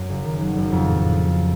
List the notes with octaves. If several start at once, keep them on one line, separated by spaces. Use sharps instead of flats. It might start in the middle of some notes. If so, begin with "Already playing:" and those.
Already playing: F#2
F#1
D#3
F#3
F#1
F2
A2
A2